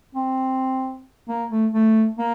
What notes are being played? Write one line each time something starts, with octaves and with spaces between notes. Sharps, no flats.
C4
A#3
A3
A3
A#3